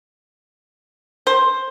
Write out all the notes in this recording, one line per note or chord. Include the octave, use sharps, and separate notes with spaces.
C5